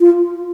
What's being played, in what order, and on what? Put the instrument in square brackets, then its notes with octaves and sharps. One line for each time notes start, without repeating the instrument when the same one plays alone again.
[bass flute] F4